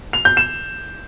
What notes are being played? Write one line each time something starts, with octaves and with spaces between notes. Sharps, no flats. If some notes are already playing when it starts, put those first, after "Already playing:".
F7
G6
E7